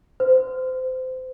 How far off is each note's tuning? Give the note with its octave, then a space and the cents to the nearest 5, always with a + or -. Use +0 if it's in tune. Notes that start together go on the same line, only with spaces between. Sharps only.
C5 -25